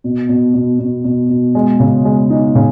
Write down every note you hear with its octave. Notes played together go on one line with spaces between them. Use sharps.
B2
B2
B2
B2
B2
B2
G#3
C#3
G#3
D#4
C#3